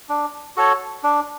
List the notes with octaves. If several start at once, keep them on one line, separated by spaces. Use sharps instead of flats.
D4
F#4 A4 C#5
D4